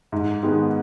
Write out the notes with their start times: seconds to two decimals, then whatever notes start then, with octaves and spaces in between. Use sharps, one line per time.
0.12 G#2
0.43 D#3 G#3 B3